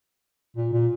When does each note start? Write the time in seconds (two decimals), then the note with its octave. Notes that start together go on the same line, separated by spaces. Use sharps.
0.56 A#2
0.73 A#2